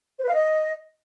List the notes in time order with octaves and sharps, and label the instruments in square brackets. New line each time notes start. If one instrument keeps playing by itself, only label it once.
[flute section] C5
B4
F5
D#5